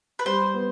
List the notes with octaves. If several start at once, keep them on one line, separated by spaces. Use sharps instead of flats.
B4
G3 C5
B3